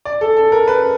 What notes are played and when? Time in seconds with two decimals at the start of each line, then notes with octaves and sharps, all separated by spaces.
0.05 D5
0.21 A4
0.37 A4
0.52 A#4
0.68 B4